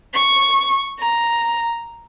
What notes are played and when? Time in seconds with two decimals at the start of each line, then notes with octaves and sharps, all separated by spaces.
0.14 C#6
0.99 A#5